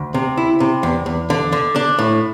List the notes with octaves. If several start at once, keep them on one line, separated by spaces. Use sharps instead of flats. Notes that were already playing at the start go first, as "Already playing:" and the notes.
Already playing: D2
C3
E4
C3
E2
E2
D3
D3
D4
A2